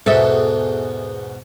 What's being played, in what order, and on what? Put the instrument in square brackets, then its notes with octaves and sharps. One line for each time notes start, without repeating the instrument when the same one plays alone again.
[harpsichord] E2 G#2 B2 [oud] A4 E5